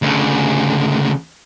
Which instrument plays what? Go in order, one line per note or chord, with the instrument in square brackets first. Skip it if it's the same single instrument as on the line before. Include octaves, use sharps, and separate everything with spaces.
[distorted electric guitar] D2 C#3